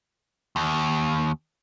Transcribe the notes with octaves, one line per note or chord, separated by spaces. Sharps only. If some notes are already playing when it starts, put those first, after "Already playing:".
D#2